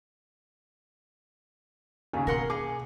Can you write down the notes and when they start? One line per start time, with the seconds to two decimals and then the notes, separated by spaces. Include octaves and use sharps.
2.13 D#2 C#3 G#5
2.27 B2 A#4 F#5 C6
2.50 G#4 D6